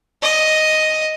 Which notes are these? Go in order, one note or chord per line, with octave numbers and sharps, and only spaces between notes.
D#5